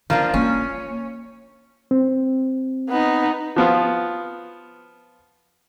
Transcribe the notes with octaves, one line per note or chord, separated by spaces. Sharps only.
D#3 F3 A#3 D4
A#3 C#4 F4
C4
B3 D#4
F3 B3 F4